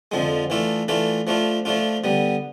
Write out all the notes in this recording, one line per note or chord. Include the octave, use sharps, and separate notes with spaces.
F2 D3 F3 G#3
E3 A3 D4 F4 A4
E3 A3 D4 F4 A4
F3 A3 D4 F4
F3 A3 D4 F4
D3 G3 B3